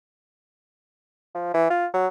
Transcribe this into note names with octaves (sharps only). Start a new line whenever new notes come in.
F3
E3
F4
F#3